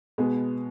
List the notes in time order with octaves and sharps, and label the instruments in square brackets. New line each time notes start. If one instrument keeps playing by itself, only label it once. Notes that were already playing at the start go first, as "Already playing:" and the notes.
[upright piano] B2 G#3 B3